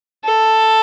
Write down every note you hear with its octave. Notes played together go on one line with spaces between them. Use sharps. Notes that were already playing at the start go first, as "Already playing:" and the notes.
A4